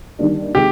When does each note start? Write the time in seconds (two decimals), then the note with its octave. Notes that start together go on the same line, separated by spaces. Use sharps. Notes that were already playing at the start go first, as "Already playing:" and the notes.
0.19 D#3 G3 A#3 D4
0.55 C3 D#3 G#3 G4